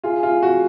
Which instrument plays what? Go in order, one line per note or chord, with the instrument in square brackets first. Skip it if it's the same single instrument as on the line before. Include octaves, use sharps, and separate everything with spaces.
[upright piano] F4 [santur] G#4
[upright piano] F4 [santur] G#4
[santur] F5
[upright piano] F#4 [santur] C#5